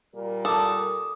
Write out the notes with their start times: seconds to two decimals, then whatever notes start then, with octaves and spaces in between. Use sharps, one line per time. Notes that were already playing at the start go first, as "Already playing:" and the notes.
0.13 A#2 G3 A#4
0.45 A4 D6 D#6